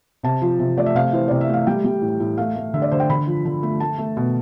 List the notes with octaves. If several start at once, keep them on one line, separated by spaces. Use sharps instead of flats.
C3 A5
F3
C3
A3 D5
E5
C3 F5
E3 C5
C3 D5
E5
A3 F5
G3 G5
G3
A2
A2
A3 F5
A3
D3 E5
D5
D3 C5
G5
D3 B5
F3
D3
A3
A3 A5
A3
B2